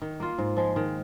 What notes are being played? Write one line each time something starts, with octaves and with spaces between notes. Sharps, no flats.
D#3
A#3 F4
G#2
F3 G#3
D#3